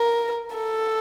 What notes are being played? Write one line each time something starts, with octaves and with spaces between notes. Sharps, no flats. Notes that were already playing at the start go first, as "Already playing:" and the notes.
Already playing: A#4
A4